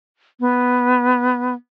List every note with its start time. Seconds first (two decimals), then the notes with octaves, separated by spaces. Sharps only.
0.40 B3